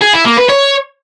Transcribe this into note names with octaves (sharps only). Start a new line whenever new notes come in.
G#4
E4
A#3
B4
C#5